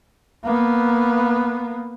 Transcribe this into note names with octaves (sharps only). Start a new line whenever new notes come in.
A#3 B3